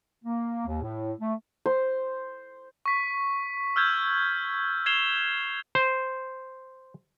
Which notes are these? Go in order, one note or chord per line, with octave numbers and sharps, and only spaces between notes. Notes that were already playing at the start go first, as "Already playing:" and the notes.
A#3
D#2
A2
A3
C5
C#6 B6
E6 F6 G6 G#6
G#6 C7 E7 F7 G7
C5